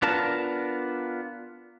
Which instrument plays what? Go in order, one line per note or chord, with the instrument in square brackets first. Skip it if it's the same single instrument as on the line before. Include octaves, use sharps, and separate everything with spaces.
[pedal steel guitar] B3 D4 F4 A#4 A5